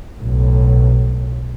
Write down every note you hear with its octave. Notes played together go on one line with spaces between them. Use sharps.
B1 A2